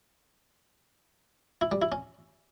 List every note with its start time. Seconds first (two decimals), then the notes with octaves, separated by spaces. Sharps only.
1.61 E4
1.72 G3
1.82 E4
1.92 C#4